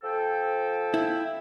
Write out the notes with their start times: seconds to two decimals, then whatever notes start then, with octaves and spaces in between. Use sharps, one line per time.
0.03 F3 A4 G5
0.94 E4